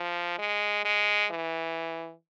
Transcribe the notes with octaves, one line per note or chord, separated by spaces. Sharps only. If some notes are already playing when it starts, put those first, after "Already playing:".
Already playing: F3
G#3
G#3
E3